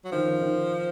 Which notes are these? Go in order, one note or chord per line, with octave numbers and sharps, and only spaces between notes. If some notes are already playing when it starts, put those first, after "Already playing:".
F#3
D#3 F3
D#3
D#3